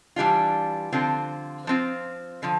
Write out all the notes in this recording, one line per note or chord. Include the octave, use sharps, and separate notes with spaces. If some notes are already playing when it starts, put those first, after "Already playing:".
E3 G3 D4 F4
D3 F3 C4 F4
F3 C4 F4
D3 F3